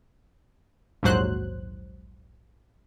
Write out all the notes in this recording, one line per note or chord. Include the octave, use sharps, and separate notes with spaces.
A#1 D#2 G#2 F#3 C5 F#6